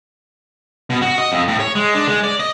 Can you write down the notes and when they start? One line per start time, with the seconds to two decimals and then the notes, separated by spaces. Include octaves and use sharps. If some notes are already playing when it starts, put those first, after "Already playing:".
0.90 B2
1.02 F#4
1.18 D#5
1.32 F2
1.48 A2
1.60 C#5
1.75 G#3
1.94 D4
2.08 G#3
2.24 D5
2.40 D#5